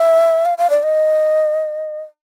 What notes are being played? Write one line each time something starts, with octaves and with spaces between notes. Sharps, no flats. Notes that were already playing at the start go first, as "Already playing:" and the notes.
Already playing: E5
F5
F5
D5
D#5